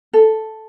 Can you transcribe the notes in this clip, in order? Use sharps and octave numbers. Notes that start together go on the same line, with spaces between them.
A4